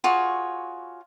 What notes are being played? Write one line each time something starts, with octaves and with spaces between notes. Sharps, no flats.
F4 F#4 G#4 C#5